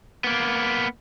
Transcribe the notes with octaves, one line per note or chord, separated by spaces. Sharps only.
A#3 B3